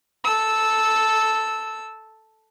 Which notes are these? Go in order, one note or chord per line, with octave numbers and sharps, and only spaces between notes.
A4 E6